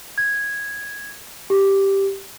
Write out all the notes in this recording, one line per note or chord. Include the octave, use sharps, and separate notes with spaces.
G#6
G4